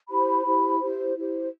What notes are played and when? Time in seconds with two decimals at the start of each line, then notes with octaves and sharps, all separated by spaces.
0.09 E4 G4 C5 B5
0.45 E4 G4 C5
0.80 E4 G4 C5
1.17 E4 G4 C5